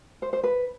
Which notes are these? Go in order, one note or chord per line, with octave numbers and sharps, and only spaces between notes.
C5
C5
B4